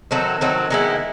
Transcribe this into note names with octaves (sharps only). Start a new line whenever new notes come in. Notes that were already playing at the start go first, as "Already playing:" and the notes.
D#3 F#3 A3 C4
D#3 F#3 A3 C4
D#3 G#3 B3 E4